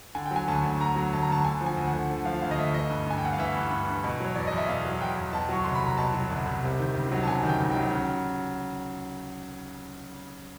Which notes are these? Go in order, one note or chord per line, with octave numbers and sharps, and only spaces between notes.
D3 G#5
G5
F#3 G#5
D2 A5
D2
D3 A#5
F#3
D2 A5
A#5
D2 A5
D3 G#5
F3
G#5
D2
F#5
D2
D3
F3 F5
D2 F5
D#5
D2 E5
E3 D#5
G2
G2 G#5
G5
E3 F#5
F5
E3 E5
G2
G2
E3
B2
F#3 C#5
E2 D5
D#5
E2
E5
B2 F5
F#3
E2 G5
E2
B2 A5
F#3 C#6
C2 C6
B5
C2 A#5
B2 A5
F#3
C2
C2
C3
D#3
C#2
F#3
A5
C3 G#5
D#3
G5
C#2
G5
F#3
C#3